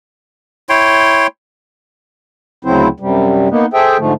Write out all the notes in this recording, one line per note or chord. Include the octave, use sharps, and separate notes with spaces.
E4 C#5 G5 C6
D2 C#3 F#3 C4 E4 C5
F#2 C3 G3
A#3 B3 D#4
G#4 A4 C5 E5 G5
G#2 D3 F3 A3